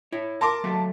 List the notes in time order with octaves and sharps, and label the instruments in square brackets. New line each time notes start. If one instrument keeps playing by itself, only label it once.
[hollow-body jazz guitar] E4 C#5
[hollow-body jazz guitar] A#4 A#5 [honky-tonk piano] A5 C6 D6
[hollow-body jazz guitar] F#3 A3 A#3